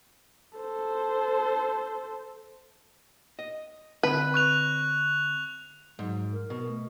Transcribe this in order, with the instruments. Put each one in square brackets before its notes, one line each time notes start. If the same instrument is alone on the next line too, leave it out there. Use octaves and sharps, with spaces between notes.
[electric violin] A4 C5
[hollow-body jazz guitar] D#5
[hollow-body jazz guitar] D3 C4 [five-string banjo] B4
[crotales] C#6 F#6 F7
[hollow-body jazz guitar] G#2 [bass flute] F#3
[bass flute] A#4
[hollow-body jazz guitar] B2
[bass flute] A3